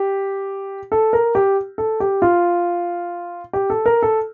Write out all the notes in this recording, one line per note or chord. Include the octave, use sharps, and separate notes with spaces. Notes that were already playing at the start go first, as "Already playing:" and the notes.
Already playing: G4
A4
A#4
G4
A4
G4
F4
G4
A4
A#4
A4